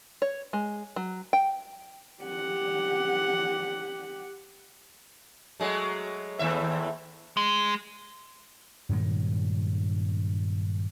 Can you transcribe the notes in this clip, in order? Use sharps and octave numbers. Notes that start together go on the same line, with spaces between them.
C#5
G#3
F#3
G5
G4 F#5
F#3 G#3 A3
D#2 A2 E5
G#3
G2 A#2 D#3 F#3